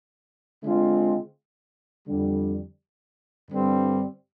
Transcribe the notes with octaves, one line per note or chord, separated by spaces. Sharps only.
D3 G#3 C4 F4
F2 D3 G3
G2 D3 G3 C4